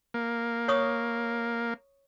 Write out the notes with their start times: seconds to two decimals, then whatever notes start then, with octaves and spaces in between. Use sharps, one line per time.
0.14 A#3
0.68 C#5 C#6 D#6